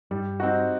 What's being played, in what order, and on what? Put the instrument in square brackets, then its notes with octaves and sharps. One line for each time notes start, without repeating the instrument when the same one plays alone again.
[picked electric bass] G2 [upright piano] G3
[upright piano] C4 D#4 F#4